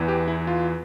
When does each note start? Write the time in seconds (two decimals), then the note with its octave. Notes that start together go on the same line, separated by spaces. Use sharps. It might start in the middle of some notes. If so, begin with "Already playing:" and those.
Already playing: E2 E3
0.08 G4
0.28 E4
0.47 F4